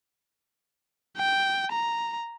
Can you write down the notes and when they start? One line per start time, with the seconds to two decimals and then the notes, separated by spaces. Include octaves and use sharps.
1.17 G5
1.72 A#5